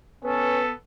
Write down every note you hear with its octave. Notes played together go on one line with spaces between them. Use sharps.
B3 C#4 A4 B4